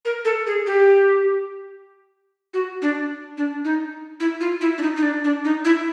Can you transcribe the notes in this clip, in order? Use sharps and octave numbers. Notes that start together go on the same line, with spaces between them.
A#4
A4
G#4
G4
F#4
D4
D4
D#4
E4
F4
E4
D4
D#4
D#4
D4
D4
D#4
E4